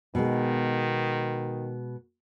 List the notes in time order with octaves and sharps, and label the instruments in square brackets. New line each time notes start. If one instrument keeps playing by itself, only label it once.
[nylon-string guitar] B2 G#3 [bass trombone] D#3